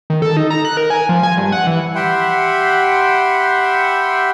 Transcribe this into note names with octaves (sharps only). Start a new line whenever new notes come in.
D#3
A4
D#4
A#5
F#6
A#4
G#5
F3
G#5
G2
F#5
E3
G4 E5 F#5 G5 B5 C6